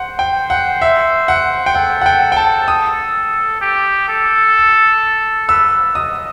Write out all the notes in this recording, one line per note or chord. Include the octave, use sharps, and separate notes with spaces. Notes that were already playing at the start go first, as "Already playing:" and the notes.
Already playing: C5 F#5
G5
F#5
E5
F#5
G5
A4 F#5
F#5
G5
G5
A5
D#6
G4
A4
B4 E6
D#5 D#6